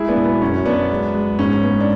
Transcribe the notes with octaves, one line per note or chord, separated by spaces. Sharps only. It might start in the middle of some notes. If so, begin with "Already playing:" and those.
Already playing: G#3 E4 G#4
B3 D4
B2
B3
F#2 C#4
F#2 B3 D4
G#3
G#3
G#2 C#4
G#3 B3
D4